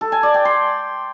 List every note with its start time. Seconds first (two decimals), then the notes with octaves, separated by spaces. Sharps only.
0.01 A4
0.12 G#5
0.23 D5
0.34 G5
0.45 C6